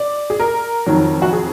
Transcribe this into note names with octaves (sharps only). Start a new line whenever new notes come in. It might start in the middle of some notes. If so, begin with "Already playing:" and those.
Already playing: D5
G#4
A#4
F2 D#3 F#3
F#4
G#4